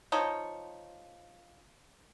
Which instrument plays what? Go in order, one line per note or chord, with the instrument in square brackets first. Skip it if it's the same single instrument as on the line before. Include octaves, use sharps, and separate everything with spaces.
[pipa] F3 D#4 C#5